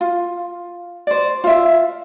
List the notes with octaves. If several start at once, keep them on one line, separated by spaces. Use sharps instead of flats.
F4
C5 D5
F4 E5